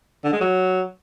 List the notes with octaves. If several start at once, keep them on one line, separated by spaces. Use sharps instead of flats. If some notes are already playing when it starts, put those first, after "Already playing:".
D3
G#3
F#3